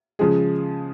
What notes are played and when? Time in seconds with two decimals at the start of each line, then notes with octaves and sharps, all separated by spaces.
0.19 C#3 F3 G#3 G#4